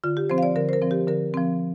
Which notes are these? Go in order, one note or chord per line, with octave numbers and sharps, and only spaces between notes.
D3 F4
G4
F3 C4 C5
F5
D5
D3 A#4
C5
A#4
F3 C4
G4
D3 A#4
F3 C4